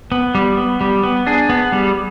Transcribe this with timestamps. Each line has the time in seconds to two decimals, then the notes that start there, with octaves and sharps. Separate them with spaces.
0.12 B3
0.35 G3
0.57 B3
0.81 G3
1.03 B3
1.27 D4 G#4
1.49 B3
1.72 G3